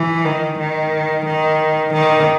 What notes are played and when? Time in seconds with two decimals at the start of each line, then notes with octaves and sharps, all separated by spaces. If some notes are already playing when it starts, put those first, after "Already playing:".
Already playing: E3
0.25 D#3
0.59 D#3
1.26 D#3
1.94 D#3